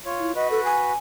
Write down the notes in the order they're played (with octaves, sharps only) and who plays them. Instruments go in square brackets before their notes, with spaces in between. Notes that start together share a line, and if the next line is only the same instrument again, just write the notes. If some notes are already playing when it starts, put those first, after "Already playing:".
[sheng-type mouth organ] F4 C#5
[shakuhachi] E4
[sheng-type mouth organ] F#4 B4 [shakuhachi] D#5
[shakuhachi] A4
G#5